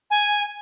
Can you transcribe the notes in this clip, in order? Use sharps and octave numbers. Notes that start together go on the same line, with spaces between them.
G#5